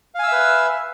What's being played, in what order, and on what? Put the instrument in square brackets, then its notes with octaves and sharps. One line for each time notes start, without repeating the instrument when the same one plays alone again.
[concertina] F5
G#5
E6
E5
B4